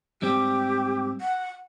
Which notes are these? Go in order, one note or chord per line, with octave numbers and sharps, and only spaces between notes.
G#2 G3 C4 G4
F#5